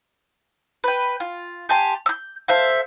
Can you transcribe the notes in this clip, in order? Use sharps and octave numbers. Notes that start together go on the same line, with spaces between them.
B4 G5
F4
G4 G#5 A5 C6
E6 G6
A4 C5 E5 F5